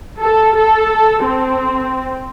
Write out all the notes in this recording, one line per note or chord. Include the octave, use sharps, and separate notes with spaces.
A4
A4
C4